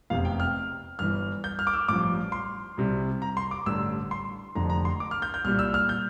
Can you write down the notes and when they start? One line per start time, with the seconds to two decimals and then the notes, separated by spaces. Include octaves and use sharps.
0.10 F1 E2 C3 F5
0.25 G5
0.40 F6
0.99 G1 G2 E3 F6
1.44 G6
1.59 F6
1.67 D6
1.73 E6
1.88 A1 G2 F3 D6
2.32 C6
2.77 C2 C3 G3
3.22 A#5
3.37 C6
3.51 D6
3.66 A1 G2 D3 E6
4.11 C6
4.55 F1 F2 D3 A#5
4.70 A#5
4.85 C6
5.00 D6
5.11 F6
5.22 G6
5.34 G6
5.44 C2 A#2 G3 F6
5.59 E6
5.74 F6
5.89 G6